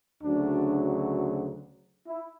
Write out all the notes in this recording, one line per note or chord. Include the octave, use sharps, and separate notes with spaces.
D2 C#3 F#3 D4
E4